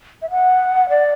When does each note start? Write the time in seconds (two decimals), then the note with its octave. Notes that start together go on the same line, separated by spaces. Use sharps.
0.22 E5
0.30 F#5
0.89 D5